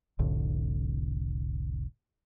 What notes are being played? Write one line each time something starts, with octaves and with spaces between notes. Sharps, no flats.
F1 C2 A2 D3